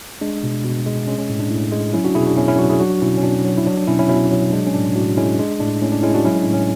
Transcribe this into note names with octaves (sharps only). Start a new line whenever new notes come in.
G#3 D4
B2
B2
G#3
G#3 C#4
C#4
A2
D4
A2
G#3
F#3 C#4 E4
D4 F#4
B2 E4 G#4
D4 F#4
B2 C#4 E4
C#4 E4
F#3 D4 F#4
E4 G#4
F#3 D4 F#4
B2 C#4 E4
C#4
B2 D4
F#3
E4
F#3 D4
D4
B2 C#4 E4
C#4 E4
B2 C#4 E4
F#3
G#3 D4
C#4
A2 D4
A2 D4 F#4
G#3 C#4 E4
G#3 D4
A2 D4
A2 C#4
D4
G#3 C#4 E4
D4 F#4
F#3 C#4 E4
D4
A2
C#4